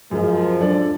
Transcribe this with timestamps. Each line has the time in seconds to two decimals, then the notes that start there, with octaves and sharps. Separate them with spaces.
0.11 F#2 F3 G#3 G#4 A#4
0.60 F#3 D4 A4 D5